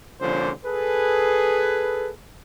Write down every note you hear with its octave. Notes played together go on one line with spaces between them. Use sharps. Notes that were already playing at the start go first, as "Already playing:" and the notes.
C2 A#2 D3 F3 C#4 C5
G#4 A4 B4